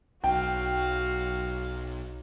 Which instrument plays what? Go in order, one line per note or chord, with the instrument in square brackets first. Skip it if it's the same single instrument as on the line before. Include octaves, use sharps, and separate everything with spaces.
[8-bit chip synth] B1 [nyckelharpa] F#4 F5 [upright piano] G5